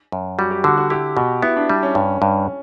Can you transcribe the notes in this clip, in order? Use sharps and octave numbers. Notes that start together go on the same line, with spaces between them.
F#2
G3 F#4
G4
D3 F#4
F#4
E4 G4
B2 F#4
B3 E4
D4
G3 D4
C#4
G2 C#4
G2